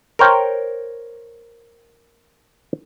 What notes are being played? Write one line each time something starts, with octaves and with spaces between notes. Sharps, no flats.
A#4 C5 C#5 G5